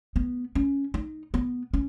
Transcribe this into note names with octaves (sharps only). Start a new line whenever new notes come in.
B3
C#4
D#4
B3
C#4